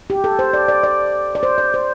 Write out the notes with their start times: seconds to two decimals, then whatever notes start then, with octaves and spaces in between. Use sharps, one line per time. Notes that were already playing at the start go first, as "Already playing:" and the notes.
0.10 G4
0.24 A4
0.39 C5
0.53 D5
0.68 D5
0.83 D5
1.35 D5
1.43 C5
1.58 D5
1.74 C5